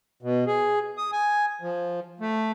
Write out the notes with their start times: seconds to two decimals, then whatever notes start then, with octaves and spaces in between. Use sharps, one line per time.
0.23 B2
0.47 G#4
0.98 D#6
1.12 G#5
1.62 F3
2.20 A3